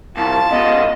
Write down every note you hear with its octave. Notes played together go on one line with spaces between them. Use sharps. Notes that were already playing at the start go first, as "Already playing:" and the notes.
C2 F4 A5
G#2 B3 D#5